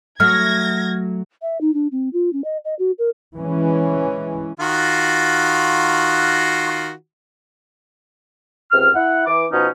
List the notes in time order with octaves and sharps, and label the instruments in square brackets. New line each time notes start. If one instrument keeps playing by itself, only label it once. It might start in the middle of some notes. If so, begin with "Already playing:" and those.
[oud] F#3 A3 [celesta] F6 [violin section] G#6 A#6
[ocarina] E5
D#4
D4
C4
F4
C#4
D#5
D#5
F#4
A#4
[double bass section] E3 G#3 C#4
[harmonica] D#3 F4 F#4
[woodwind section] C#2 C3 F6
E4 F#5
E3 D6
B2 F3 C#4 D#4